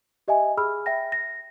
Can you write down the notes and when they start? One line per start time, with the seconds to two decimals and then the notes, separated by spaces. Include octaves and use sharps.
0.28 G4 D#5 E5 G#5
0.57 G#4 B5 E6 F6
0.86 E5 G5 A#6
1.12 A#6